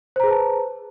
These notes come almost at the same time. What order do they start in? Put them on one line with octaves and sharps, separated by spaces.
C5 A#5 G#4 B4 A5